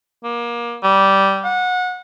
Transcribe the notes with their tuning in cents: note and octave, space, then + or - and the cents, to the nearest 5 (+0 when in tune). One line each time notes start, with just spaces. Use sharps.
A#3 +25
G3 -10
F#5 -25